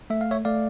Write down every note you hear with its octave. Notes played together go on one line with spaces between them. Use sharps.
A3 E5
F5
C#5 E5
A3 D5 F5